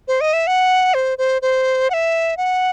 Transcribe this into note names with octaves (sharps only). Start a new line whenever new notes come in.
C5
D#5
E5
F#5
C5
C5
C5
F#5
E5
F#5